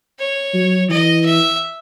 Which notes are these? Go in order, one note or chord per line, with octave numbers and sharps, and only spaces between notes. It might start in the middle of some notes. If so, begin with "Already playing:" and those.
C#5
F#3
E3 D#5
E5